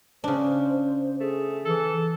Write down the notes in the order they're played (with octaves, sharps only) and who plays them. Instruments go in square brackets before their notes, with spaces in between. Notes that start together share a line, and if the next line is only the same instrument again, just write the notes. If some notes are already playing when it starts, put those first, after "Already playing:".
[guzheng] C#3 D4 [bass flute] C5
[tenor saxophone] A3 [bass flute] G#4
[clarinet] E3 [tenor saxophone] A4